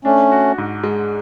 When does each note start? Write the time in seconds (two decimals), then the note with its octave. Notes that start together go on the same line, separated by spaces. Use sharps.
0.05 A3 C#4 D4
0.31 F#4
0.58 G#2
0.84 G#3